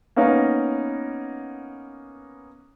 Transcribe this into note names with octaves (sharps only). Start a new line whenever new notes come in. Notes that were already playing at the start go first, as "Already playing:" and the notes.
A#3 B3 C#4 D#4